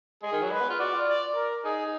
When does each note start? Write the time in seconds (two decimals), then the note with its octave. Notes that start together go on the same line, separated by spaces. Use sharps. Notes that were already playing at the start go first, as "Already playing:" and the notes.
0.23 G#3 G#4
0.32 D#3
0.42 F#3
0.51 G#3 B4
0.61 B3
0.70 F4
0.79 F#4 D5
0.94 F4
1.08 D5
1.36 A#4
1.64 D#4 G#4